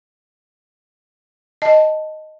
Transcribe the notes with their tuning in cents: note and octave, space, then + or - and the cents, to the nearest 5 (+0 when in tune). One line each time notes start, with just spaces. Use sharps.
D#5 +0 A5 +0